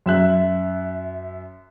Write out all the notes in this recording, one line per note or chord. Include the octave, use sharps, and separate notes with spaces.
F#2 E5 F#6